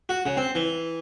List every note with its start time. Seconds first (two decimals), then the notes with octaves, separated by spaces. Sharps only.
0.09 F#4
0.26 C#3
0.37 C4
0.55 E3